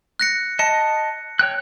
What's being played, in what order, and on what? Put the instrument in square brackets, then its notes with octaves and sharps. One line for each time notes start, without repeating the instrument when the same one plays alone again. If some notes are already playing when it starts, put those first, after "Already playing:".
[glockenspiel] F#6 A#6 C#7
[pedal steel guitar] D#5 A5 [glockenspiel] C#7
[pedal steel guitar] C#5 G5 F#6